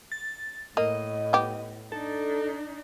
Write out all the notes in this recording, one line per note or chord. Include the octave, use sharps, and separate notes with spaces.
A6
A2 A#3 D#5
B3 G4
D4 D#4 A4